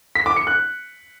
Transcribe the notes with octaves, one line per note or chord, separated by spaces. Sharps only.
B6
D6
C#7
F#6